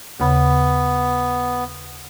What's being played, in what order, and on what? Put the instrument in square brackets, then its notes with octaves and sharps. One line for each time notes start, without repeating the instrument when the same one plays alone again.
[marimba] D#2 C#3 B5 [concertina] B3